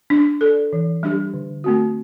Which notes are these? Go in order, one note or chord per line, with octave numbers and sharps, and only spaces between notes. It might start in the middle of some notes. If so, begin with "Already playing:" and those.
D4
A4 D5
E3
G3 D4 G4
D3
A3 C4 F#4